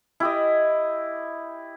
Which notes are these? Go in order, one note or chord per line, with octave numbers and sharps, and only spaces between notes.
E4 G4 D#5